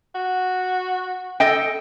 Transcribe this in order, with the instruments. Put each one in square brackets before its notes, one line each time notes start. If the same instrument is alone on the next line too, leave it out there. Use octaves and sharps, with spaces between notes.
[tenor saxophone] F#4
[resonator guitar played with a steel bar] A4 D#5 G5